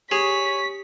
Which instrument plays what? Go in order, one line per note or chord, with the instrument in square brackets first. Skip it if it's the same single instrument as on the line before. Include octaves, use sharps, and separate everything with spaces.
[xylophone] G4 [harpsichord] G#4 [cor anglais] C#5 [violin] B6